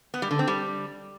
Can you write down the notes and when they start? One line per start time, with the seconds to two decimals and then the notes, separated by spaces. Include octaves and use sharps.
0.14 B3
0.22 G3
0.31 D3
0.39 C4
0.48 G3